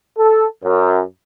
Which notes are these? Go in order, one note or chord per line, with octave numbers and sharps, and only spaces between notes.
A4
F#2